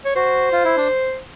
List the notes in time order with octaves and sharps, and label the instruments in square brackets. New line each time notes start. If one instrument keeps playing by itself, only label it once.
[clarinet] C#5
[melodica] F#4 [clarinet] C5
[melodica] F4
E4
D4